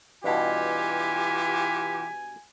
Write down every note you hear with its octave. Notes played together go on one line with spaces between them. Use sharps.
G2 B2 E3 F4 G4 G#5